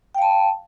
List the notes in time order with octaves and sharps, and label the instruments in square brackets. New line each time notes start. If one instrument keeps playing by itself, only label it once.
[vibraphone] G5
F5
A5